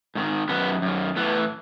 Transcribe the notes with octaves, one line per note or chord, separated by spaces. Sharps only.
G#2 D#3
F#2 D#3 B3
F#2 D#3
A2 E3 B3